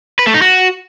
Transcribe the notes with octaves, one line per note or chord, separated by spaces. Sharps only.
B4
A3
D#4
F#4